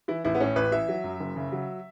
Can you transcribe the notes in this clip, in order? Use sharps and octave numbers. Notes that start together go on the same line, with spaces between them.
E3 E4
A1 E4
B3
A2 C#4
A1 B4
E3 E5
F#3
F#2
F#1
C#3
F#3